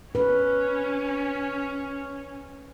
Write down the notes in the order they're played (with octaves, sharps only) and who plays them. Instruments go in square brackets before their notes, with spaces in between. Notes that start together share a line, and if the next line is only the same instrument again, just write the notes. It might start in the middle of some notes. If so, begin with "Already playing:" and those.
[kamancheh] C#4 [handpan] B4